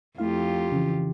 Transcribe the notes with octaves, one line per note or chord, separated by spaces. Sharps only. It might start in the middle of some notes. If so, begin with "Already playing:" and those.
F2 A3 E4 F4 G4 F5
C#3 E3